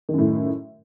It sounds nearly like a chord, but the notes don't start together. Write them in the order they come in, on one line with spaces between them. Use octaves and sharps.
D#3 F#2 A2